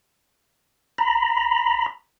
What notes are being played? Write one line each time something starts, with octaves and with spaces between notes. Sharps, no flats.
A#5 B5